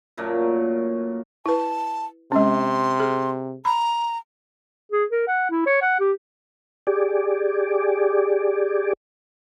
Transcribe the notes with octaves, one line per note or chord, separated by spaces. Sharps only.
F#2 A#2 A3 A#3
E4 B4 A5
C3 G#3 C#4 C6
G#4
A#5 B5
G#4
A#4
F#5
E4
C#5
F#5
G4
G4 G#4 D5